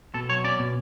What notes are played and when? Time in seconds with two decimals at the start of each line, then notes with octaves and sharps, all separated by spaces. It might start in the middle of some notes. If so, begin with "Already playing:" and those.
0.14 B2 A4
0.29 F#3 C#5
0.44 C#4 D5
0.59 B2